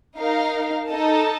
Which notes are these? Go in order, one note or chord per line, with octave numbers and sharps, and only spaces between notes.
D#4 A#4 F5
D#4 A4 D#5 A5